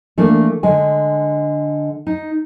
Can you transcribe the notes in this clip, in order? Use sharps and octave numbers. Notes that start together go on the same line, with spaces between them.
E3 A3 A#3 D4 F4
D3 G#3 G#5
D#4